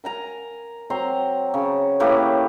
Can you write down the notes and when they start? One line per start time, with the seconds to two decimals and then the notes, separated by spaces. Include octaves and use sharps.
0.04 A#4 G#5 A#5
0.90 F#3 C4 A#5 C6
1.54 C#3
2.00 A2 A#3 G4 B4